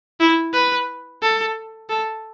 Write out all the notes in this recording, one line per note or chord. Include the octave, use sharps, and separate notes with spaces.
E4
B4
A4
A4